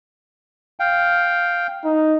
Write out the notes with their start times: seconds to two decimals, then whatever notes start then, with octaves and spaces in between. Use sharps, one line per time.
0.80 F5 G5
1.85 D#4